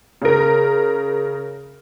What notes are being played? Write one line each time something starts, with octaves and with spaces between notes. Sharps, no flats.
C#3 A#4